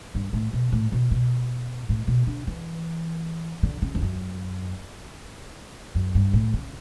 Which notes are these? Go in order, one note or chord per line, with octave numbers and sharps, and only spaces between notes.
G2
A2
B2
A2
B2
B2
A2
B2
D3
E3
D3
C#3
E2
F#2
F#2
G2
A2
C#3